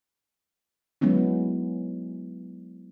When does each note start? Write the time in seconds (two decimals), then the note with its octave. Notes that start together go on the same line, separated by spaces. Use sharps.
1.01 F#3 G#3 B3 C#4 E4